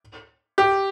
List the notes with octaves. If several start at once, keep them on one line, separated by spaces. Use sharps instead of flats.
G4